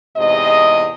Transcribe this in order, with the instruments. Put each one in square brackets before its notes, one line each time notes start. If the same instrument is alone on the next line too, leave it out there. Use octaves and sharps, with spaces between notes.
[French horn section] E2 G#2 C3 D#5